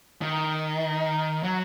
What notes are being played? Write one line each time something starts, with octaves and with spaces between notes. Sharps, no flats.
D#3
F#3